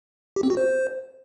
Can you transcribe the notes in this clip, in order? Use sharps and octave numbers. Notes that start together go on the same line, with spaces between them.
G4
C4
F#4
C5